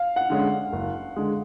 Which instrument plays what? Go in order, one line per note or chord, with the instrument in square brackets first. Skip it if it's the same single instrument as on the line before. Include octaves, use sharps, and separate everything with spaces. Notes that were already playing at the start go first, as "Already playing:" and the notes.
Already playing: [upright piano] F5
F#5
[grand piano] D3 G#3 C#4
F#1
D3 G#3